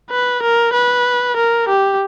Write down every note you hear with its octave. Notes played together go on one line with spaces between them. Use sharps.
B4
A#4
B4
A#4
G4